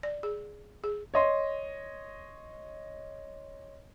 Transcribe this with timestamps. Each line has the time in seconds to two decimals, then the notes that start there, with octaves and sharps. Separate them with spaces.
0.03 D5
0.23 G#4
0.84 G#4
1.14 C#5 D#5 C6